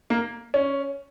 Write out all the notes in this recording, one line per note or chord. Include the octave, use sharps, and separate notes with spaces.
A#3
C#4